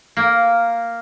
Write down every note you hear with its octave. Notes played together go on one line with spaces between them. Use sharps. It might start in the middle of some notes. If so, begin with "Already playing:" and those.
A#3